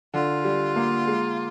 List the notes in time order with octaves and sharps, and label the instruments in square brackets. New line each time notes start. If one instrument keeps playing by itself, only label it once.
[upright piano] D3 [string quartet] F4
[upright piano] G3
A#3
G#3